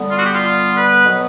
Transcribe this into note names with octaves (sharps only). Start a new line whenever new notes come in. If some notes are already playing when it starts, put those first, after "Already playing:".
Already playing: D3 G3 B3
F4
F#4
G4
F4
B4
B2 F#3 B3